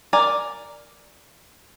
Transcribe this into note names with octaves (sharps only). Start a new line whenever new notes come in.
A#4 D5 G#5